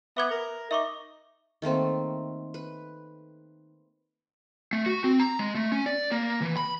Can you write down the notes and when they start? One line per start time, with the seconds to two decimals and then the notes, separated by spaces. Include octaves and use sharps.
0.17 B3 E5 D6 G#6
0.31 A#4
0.71 D#4 E5 C#6 D6
1.62 D#3 A3 A#3 C4
2.54 B4
4.73 A3
4.86 F#4
5.04 C4
5.20 A#5
5.39 G#3
5.55 A3
5.72 C#4
5.86 D5
6.11 A#3
6.42 E3
6.57 B5